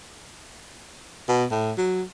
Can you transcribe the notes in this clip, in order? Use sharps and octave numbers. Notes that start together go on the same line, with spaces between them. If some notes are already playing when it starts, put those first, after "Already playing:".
B2
A2
F#3